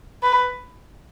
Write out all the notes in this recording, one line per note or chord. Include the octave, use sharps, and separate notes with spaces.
B4